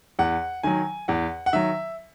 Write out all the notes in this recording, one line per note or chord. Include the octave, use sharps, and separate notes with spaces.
E2 F#5
D#3 F#3 G#5
E2 F#5
F#5
D#3 F#3 E5